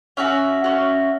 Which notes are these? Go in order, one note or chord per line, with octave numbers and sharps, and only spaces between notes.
C#4 F#4 E5
C#4 F#4